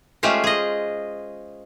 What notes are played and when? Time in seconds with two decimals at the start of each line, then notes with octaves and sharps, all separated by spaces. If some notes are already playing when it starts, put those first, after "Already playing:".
0.23 G#3 A3 C#4 F4 G4 C5
0.44 G#4 D#5